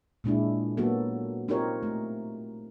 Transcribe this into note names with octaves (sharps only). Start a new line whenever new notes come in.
A#2 G#3 D4 E4
F#3 A#3 B3 F#4 A4
C4 D#4 F4 G4 A#4 C#5
A3